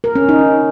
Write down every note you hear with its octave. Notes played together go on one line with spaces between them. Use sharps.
A#4
C#4
D#4